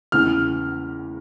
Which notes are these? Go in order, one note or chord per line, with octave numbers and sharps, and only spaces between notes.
E2 C#3 E3 F6